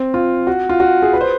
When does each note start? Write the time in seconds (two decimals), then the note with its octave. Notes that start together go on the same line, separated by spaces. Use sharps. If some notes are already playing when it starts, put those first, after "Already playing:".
Already playing: C4
0.14 F4
0.47 F#4
0.69 F4
0.80 F#4
1.02 G#4
1.13 B4
1.21 C5